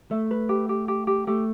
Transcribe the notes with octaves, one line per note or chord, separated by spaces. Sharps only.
A3 E5
B4
G4
G4
G4
G4
A3 G4